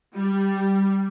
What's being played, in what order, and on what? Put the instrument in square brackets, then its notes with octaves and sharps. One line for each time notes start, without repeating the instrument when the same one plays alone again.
[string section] G3